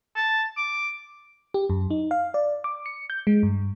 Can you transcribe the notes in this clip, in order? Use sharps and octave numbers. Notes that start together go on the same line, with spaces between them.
A5
D6
G4
F#2
D#4
F5
D5
D6
C#7
G6
G#3
G2